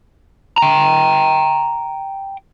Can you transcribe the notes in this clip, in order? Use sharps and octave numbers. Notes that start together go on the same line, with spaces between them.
G5 A#5